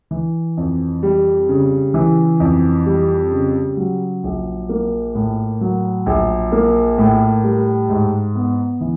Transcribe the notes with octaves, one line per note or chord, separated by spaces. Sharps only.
E3
F2
G3
C#3
E3
F2
G3
C#3
F#3
A#1
A#3
A2
F#3
A#1
A#3
A2
G3
G#2
B3
E3